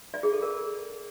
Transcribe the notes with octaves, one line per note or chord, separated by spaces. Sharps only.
D5
G#4
A4
A#4